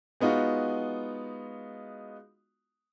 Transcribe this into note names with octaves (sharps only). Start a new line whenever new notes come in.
G#3 B3 D#4 F4 F#4